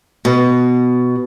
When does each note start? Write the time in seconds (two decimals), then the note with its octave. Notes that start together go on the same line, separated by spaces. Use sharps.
0.25 B2